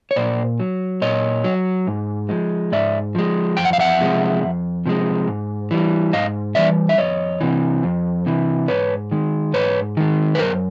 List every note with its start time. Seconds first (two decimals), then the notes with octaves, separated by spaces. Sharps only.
0.11 C#5
0.16 A#2 C5 D5
0.60 F#3
1.02 A#2 C#5 D#5
1.44 F#3
1.87 G#2
2.29 F3 G#3
2.72 G#2 D5 E5
3.15 F3 G#3
3.57 F2 G5
3.65 F#5
3.73 F5
3.79 E5 F#5
4.00 C3 F3 G#3
4.43 F2
4.86 C3 F3 G#3
5.27 G#2
5.71 E3 G3
6.13 G#2 D#5 F5
6.55 E3 G3 D5 E5
6.89 E5
6.98 F2 C#5 D#5
7.41 C3 E3
7.83 F2
8.26 C3 E3
8.68 G#2 B4 C#5
9.11 D#3 G#3
9.53 G#2 B4 C#5
9.97 D#3 G#3
10.35 B4
10.39 F#2 A#4 C5